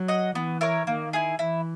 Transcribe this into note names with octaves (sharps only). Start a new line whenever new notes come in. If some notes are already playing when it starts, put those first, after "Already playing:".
Already playing: F#3
D#5 F#5
E3 B3
E4 A#4 C#5
D#3 A#3
E4 G#4
E3 E4